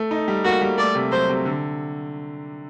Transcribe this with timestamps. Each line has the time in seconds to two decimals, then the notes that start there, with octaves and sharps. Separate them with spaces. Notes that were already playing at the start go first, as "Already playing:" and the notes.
Already playing: A3
0.11 D#4
0.28 G3
0.44 A#3 F#4
0.61 G3
0.78 A3 D5
0.95 C3
1.12 F#3 C5
1.29 C3
1.45 D3